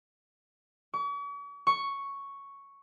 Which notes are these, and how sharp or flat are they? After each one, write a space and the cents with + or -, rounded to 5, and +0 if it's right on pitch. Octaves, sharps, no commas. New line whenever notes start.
C#6 +45
C#6 +0